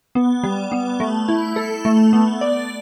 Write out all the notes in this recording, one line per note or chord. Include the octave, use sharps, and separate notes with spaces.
B3
G3
B3
A3
E4
A4
A3
B3
D5